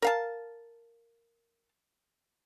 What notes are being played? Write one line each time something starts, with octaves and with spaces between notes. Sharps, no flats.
A#4 F5 A5